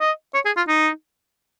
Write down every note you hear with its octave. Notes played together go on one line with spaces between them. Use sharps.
D#5
C#5
G#4
F4
D#4